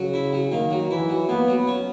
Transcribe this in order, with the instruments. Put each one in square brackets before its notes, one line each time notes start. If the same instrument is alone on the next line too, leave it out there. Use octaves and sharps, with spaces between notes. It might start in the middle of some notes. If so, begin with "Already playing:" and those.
Already playing: [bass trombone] C#3 [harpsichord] F#3
[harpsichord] E4
F#3
[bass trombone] D#3 [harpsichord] A#3
[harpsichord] F#3
[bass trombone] E3 [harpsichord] E4
[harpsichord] F#3
[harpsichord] A#3 [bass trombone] B3
[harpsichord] F#3
C#4